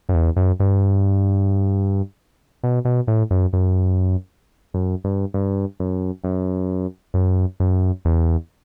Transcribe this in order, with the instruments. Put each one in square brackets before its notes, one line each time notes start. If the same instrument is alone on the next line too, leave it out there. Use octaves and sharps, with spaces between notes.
[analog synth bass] F#2
E2
F#2
G2
B2
B2
A2
F#2
F#2
F#2
G2
G2
F#2
F#2
F#2
F#2
E2